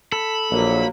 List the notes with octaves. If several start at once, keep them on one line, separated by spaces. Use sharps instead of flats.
A4 B5
A#1 F#3 A#3